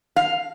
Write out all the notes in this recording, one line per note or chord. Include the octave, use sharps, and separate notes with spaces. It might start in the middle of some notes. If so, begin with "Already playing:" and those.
F5